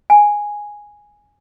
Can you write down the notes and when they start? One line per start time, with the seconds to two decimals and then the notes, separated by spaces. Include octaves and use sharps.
0.10 G#5